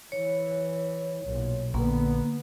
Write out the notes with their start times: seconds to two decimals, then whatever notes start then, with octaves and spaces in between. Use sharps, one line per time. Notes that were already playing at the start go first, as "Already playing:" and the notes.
0.12 E3 C#5
1.24 B1 A#2
1.74 A#1 D3 A#3 B3